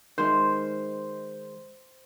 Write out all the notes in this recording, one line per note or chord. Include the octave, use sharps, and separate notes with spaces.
D#3 G#3 C5